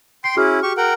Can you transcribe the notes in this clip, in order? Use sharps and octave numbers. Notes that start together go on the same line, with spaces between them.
G5 C6 C7
C#4 E4 F#4 G#4 F6
G4 C#6
A#4 F#5 G5